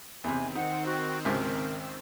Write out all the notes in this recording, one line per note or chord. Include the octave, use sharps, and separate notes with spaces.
E2 C3 D#3 C4 G#5
D#4 F#5
F#4
G#1 C#2 C3 A#4
E6